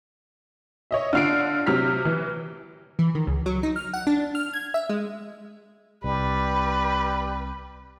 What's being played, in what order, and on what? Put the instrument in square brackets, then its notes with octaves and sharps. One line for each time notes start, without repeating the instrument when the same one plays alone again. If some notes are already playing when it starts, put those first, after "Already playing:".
[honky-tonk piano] C#5 D#5 E5
D3 F4 F6 C7 D7
C3 F#3 F6 B6
E3
[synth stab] E3
D#3
C#2
F#3
D#4
F6
F#5
D4
F6
G#6
E5
G#3
[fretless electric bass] C2 [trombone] G3 [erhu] B4